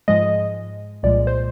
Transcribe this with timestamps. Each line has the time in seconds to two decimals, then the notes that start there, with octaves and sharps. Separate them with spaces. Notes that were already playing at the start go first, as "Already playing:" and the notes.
0.08 G#2 F3 G#3 D#5
1.03 C2 A#2 F3 G#3 D5
1.27 C5